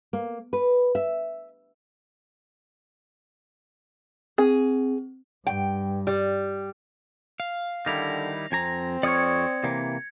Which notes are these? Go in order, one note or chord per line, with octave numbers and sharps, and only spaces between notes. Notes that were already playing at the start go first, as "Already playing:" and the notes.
A#3
B4
E5
C4 G#4
G2 G5
G3
F5
D3 D#3 G3 E4 A#6 F7
F2 C4 G#5 A#5
F2 C#5 D5 D#6 F6 G#6 C#7
C3 E3 A#3